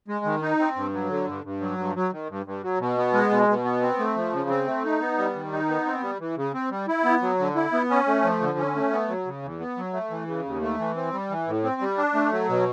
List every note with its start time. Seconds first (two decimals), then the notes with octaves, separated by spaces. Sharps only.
0.08 G#3
0.25 D#3
0.42 D#4
0.59 C4
0.76 G2
0.94 F#3
1.10 D3
1.27 G2
1.44 G2
1.61 F#3
1.78 G2
1.95 F#3
2.12 D#3
2.29 G2
2.46 G2
2.63 F#3
2.80 B2
2.97 B3
3.13 G#3
3.30 B2
3.48 B2
3.65 B3
3.82 C4
3.99 A3
4.16 F3
4.33 C#3
4.49 C4
4.67 A3
4.84 D#4
5.01 B3
5.18 G3
5.35 D#3
5.52 D#4
5.69 B3
5.86 C4
6.02 G3
6.20 E3
6.37 C#3
6.54 C4
6.71 G3
6.88 E4
7.05 B3
7.22 F#3
7.39 D3
7.55 E4
7.73 B3
7.90 C#4
8.07 A3
8.24 F3
8.41 D3
8.58 C#4
8.75 A3
8.92 B3
9.09 F#3
9.26 C#3
9.42 E2
9.60 B3
9.77 F#3
9.93 A3
10.10 E3
10.27 C#3
10.45 D#2
10.61 A3
10.79 E3
10.96 C4
11.13 G3
11.30 E3
11.47 A2
11.63 C4
11.81 G3
11.98 D4
12.14 A3
12.32 F#3
12.49 B2